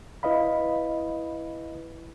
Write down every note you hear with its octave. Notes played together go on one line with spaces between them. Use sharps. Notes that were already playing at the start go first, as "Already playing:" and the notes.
E4 B4 D#5 F5 B5